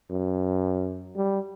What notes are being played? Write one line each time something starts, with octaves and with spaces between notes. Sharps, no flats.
F#2
G3